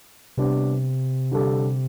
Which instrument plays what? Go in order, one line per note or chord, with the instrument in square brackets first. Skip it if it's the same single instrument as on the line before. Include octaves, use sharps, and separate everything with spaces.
[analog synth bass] C3 [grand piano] G3 B3 D4
[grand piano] D3 G3 D4 A4